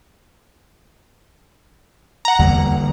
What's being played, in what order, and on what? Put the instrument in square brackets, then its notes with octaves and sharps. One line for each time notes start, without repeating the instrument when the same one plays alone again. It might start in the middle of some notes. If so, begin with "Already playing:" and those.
[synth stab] F#5 A#5
[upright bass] E2 [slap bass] D3 G3 A#3